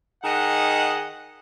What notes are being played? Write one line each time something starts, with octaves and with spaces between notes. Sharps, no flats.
D#3 G#4 D#5 F#5